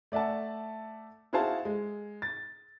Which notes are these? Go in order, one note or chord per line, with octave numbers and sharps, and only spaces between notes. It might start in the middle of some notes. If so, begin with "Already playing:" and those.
A3 D5 E5 F#5 A5
E4 F#4 G#4 C5 F5 A5
G#3
A6